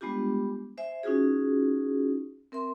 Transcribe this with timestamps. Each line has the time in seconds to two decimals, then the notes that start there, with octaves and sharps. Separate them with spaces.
0.01 G3 G#3 B3 D4 F4 G4
0.78 C5 E5 G#5
1.03 C#4 D#4 F4 F#4 G#4
2.52 C4 A#4 E5 C6